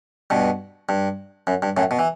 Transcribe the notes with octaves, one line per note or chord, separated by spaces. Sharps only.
G2 B2
G2
F#2
G2
F#2 A2
B2
E3